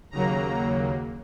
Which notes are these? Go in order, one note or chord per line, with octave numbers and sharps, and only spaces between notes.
D#2 C#3 F#3 A#3 A#5